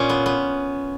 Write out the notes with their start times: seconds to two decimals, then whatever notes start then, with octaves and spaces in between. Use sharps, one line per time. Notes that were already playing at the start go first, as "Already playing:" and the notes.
Already playing: A#2 C#4
0.09 B3
0.26 B3